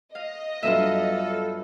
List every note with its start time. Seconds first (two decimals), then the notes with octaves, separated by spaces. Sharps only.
0.15 D#5 F5
0.63 G2 F#3 B3 F4 A4 E5 F5